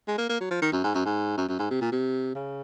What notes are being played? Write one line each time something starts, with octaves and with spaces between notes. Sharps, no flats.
G#3
A#3
A#3
F#3
F3
D#3
F#2
G#2
F#2
G#2
F#2
F#2
G#2
C3
A#2
C3
C#3